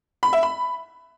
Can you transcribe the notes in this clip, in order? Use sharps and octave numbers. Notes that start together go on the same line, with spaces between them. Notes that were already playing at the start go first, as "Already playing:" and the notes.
B5
E5
B5